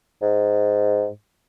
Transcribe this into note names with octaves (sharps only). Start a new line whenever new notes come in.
G#2